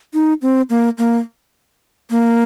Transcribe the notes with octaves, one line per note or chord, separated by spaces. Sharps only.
D#4
C4
A#3
A#3
A#3